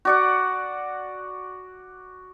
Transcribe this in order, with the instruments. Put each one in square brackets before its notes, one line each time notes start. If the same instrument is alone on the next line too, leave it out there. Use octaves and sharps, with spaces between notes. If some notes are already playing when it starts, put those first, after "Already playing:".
[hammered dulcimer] F#4 D5 F#5